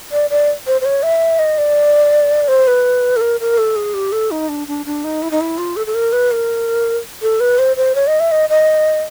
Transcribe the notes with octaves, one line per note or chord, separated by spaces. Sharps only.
D5
D5
C5
C5
C#5
E5
D#5
D5
C5
B4
A4
A#4
A#4
A4
G#4
G4
A4
D#4
D4
D4
D4
D#4
E4
D#4
E4
F4
A4
A4
A#4
B4
A#4
A4
B4
C5
C5
C#5
D#5
E5
D#5
D#5